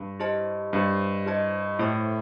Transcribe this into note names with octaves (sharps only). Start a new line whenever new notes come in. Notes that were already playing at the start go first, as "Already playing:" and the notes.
Already playing: G2
E4 G4 C5 D#5 A5
G2 E4 G4 C5 D#5 A5
E4 G4 C5 D#5 A5
A2 E4 A4 C5 E5 A5